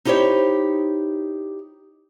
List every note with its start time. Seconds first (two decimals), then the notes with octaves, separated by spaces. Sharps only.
0.05 D#4 E4 G4 A#4 C5 C#5